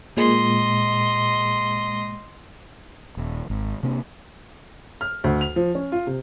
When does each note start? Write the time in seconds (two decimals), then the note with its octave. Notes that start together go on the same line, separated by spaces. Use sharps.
0.17 A#2 G#3 D#5 C6
3.17 D#1
3.50 G#1
3.83 C3 A#3 C4 D4
5.01 F6
5.24 D2
5.41 F7
5.56 F3
5.75 C#4
5.92 F4
6.07 C3